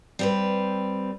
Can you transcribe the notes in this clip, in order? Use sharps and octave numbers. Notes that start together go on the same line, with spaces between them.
G3 C4 B4